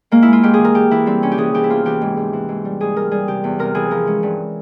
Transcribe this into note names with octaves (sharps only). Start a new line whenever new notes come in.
G#2 A#3
E4
G#3 F4
G#2 G4
G#4
E3
A#4
E3 G4
E3 E4
G3 C4
C3 C#4
G4
E3 G#4
E3 G4
E4
E2 F4
E3 G4
G#2
G#2
E3
G#2
G3
G#2 G#4
G3 A#4
G3 G#4
C3 G4
E2
C3 A#4
E3 G#4
F3 A#4
G#3 C#4
G2